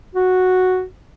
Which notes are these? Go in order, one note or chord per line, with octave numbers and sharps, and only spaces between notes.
F#4